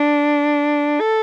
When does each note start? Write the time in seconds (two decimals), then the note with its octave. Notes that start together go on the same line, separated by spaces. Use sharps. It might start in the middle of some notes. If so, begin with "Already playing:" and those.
Already playing: D4
1.00 A4